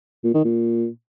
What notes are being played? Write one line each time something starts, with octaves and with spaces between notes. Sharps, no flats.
A#2
D#3
A#2